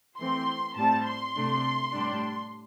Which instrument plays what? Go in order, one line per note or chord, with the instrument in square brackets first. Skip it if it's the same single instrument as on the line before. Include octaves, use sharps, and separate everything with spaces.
[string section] E3 A3 C4 C6
A2 G3 C4 A5
C6
C3 A3 D4
A2 G3 D4